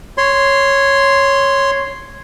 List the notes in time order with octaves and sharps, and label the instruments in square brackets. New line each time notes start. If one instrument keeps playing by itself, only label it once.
[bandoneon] C#5 C6